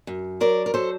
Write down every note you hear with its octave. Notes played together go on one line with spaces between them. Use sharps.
F#2
F#3 A#4 D5
A#4
F#3 A4 C5